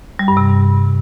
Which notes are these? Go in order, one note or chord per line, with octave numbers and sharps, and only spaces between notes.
G3
G2
C3